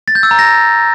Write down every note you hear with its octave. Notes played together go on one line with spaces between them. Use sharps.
A6
G6
E6
A#5
A#6